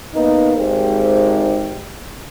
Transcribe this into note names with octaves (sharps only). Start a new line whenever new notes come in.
A#3 B3 D#4
G#1 G#2 G#3 G4 C5